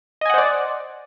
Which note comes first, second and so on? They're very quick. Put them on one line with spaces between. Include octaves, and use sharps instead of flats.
D#5 G#5 F#5 C5 D5